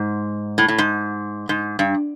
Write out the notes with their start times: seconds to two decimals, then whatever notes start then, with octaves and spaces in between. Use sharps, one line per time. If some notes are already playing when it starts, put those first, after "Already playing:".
Already playing: G#2
0.58 A2
0.68 A2
0.78 G#2
1.49 G#2
1.79 G2